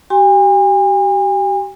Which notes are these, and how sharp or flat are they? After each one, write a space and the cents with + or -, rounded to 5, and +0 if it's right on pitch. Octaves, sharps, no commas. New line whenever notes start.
G4 -40 G#5 -45 C6 +15